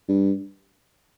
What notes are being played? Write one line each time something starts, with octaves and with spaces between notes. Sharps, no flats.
G2